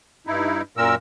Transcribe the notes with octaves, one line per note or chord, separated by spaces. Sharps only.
G2 D#4 E4
F#2 A#2 A#4 E6